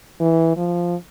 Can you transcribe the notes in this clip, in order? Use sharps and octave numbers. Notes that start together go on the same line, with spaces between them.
E3
F3